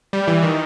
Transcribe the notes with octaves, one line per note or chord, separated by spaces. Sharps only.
G3
E3
D#3